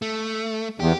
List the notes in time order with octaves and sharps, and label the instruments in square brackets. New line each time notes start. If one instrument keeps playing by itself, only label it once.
[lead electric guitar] A3
[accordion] E2 [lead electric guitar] G4